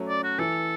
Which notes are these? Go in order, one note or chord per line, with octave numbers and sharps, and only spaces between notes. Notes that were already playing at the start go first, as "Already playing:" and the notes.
Already playing: F#3 A3 C#4
D5
F#4
E3 A4